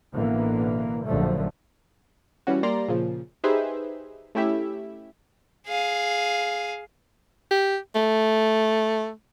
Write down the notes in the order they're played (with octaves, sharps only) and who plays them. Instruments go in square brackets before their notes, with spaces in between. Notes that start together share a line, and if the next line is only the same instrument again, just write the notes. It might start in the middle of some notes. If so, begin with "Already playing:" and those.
[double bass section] A1 B2 D3 E3 A#3
A#1 F#2 D3 F3 A3
[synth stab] E3 G3 C#4 F#4
G3 A#3 D5 A#5 C6 A#6
A#2 C#3 F3
D#4 G4 G#4 B4 C5 E5
A3 C#4 E4 G4 E5
[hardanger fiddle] G#4 F5
[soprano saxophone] G4
A3